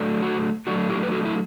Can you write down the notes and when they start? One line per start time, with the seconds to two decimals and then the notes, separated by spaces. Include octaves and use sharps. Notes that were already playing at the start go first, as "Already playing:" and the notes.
Already playing: F#3 A3 D4
0.22 F#4
0.67 F#3 A3 D4 F#4
0.89 E4 G4
1.03 B4
1.11 F#4 A4
1.25 E4